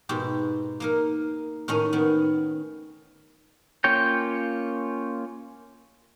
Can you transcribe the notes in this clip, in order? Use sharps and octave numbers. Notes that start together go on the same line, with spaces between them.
G#2 B2 G4
A#3 D#4 A#4
A2 D#3 C#4 D#5 A#5
D#3 B3
A#3 C#4 F4 C#5 G5